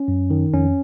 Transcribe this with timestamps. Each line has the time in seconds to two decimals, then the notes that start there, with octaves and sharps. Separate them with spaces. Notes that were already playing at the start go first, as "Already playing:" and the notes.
Already playing: C#4
0.08 F#2
0.30 D#3
0.53 F2 C#4